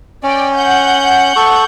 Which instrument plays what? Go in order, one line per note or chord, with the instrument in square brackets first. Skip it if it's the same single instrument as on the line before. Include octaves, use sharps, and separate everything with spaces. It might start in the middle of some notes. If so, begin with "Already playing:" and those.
[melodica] C#4 [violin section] D5 G5
[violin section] F#5 G6
[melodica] A4 C#6